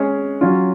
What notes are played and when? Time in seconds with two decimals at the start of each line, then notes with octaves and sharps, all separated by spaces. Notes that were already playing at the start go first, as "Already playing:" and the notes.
Already playing: G#3 C#4 G#4 C#5
0.41 F#3 C#4 F4